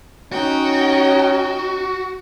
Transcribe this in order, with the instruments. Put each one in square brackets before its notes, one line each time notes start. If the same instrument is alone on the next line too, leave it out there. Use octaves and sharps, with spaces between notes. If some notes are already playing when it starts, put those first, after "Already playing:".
[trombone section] C#4 [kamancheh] D#4 G5 [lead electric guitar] F#4